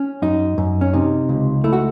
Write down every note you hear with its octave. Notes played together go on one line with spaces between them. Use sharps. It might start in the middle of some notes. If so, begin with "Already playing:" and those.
Already playing: C#4
F#2 D#4
F#2
C#4
C3 D#4
C#2
A3 E4
F#4